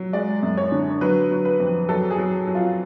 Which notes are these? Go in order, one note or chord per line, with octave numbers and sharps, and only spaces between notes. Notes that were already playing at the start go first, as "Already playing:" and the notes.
Already playing: F#3
G#3 D5
F#2
C#5
D3
F#3 B4
F#3
B4
F2
F#3 A4
G#4
F#3
F#3
F4